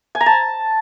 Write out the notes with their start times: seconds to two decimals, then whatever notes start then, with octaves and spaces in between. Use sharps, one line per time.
0.15 G#5
0.21 A#5
0.26 A5